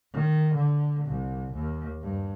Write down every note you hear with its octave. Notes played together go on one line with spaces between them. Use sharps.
D#3
D3
C2
D#2
G2